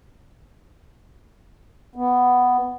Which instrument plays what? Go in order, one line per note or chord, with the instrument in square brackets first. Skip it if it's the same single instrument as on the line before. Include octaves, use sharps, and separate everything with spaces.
[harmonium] B3